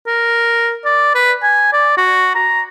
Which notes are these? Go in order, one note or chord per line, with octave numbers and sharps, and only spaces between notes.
A#4
D5
B4
G#5
D5
F#4
A#5